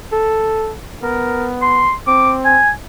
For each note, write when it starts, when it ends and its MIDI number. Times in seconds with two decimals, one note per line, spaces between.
0.13 0.74 69
1.03 1.88 59
1.03 1.48 70
1.62 1.93 84
2.07 2.60 60
2.07 2.33 86
2.45 2.70 80